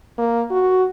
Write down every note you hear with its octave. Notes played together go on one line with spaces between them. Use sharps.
A#3
F#4